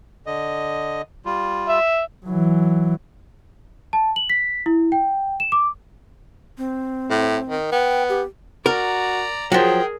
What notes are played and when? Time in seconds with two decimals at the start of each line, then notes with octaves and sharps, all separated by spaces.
0.26 D3 D#5
1.25 G3 F4
1.69 E5
2.26 E3 F#3
3.93 A5
4.16 F#7
4.30 B6
4.66 E4
4.92 G5
5.40 E7
5.52 D6
6.58 C4
7.10 A2
7.49 D#3
7.72 B3 G5
8.09 G4
8.66 F#4 A#4 D5 A#5
9.52 F3 F#3 G#4 A#4 G5